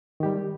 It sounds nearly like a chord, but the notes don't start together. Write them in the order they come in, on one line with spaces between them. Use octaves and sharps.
D#3 G4 G3